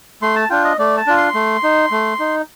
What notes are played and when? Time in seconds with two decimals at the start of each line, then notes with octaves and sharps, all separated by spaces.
0.22 A3 C6
0.36 A5
0.50 D4 F4 G5
0.64 D#5
0.79 A3 D5
0.97 A5
1.07 D4 F4
1.17 C6
1.35 A3
1.63 D#4
1.91 A3
2.19 D#4